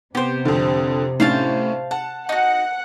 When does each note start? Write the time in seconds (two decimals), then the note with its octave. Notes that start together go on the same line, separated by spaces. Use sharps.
0.15 C3 B3 G4 C5
0.45 F2 D3
1.20 A2 C#4 D4 C5 F5 A5
1.91 F#5 A5
2.29 D#4 F#4 F#5